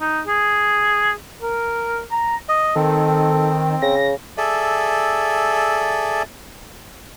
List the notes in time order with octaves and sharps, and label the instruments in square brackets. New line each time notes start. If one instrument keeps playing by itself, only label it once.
[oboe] D#4
G#4
A#4
A#5
[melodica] D#5
[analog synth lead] D#3 [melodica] C4 [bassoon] A4
[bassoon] C#3 [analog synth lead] A#6
[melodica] G#4 A4 D5 E5